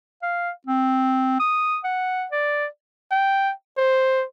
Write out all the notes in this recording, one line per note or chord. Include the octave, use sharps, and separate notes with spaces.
F5
C4
D#6
F#5
D5
G5
C5